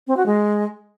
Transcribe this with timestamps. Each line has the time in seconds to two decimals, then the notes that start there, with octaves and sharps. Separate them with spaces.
0.07 C4
0.17 F#4
0.26 G#3